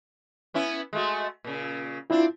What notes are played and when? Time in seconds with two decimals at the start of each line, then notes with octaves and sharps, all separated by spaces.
0.54 B3 C#4 E4
0.93 G#3 A3 F#4
1.45 A#2 C#3
2.10 C4 D4 E4 F4